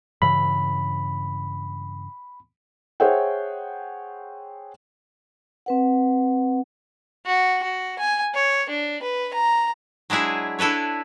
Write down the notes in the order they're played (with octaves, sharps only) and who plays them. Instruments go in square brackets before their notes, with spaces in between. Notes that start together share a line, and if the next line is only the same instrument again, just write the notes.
[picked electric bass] G2 C#3 E3 [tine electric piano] B5
[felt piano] G#4 C5 C#5 E5 F#5 G5
[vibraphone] C4 B4 F#5
[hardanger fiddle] F#4
F#4
G#5
C#5
D4
B4
A#5
[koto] F#3 G#3 D4 E4 G#4
D4 E4 A4 B4 C#5